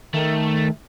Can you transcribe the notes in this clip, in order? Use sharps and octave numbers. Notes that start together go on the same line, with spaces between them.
D#3 A3